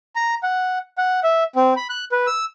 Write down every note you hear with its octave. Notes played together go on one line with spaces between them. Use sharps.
A#5
F#5
F#5
E5
C4
B5
F#6
B4
E6